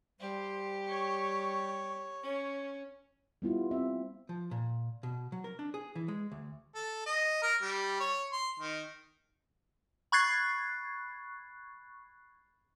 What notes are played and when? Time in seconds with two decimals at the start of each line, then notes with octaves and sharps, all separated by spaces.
0.20 G3 G4 C5
0.89 C#5 C#6
2.23 C#4 C#5
3.42 G3 B3 E4 F4
3.71 C4 E5
4.29 F3
4.51 A#2
5.03 B2
5.32 F#3
5.44 A#4
5.59 D4
5.74 G#4
5.96 E3
6.08 G#3
6.32 D2
6.75 A4
7.06 D#5
7.42 A#4
7.62 G3
8.00 C#5
8.32 C6
8.60 D#3
10.12 B5 C#6 F#6 G#6 A6 C7